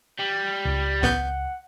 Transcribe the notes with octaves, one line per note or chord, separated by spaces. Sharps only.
G3
C#2
A1 B3 F#5 G6